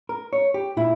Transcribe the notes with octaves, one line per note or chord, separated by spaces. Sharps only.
A#4
C#5
G4
A#2 E4